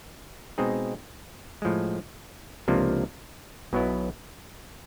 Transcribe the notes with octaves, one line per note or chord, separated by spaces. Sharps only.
B2 G#3 C4 D#4 G#4
A2 F3 G#3
C#2 C3 F3 A#3 D4
B1 B2 F#3 B3 E4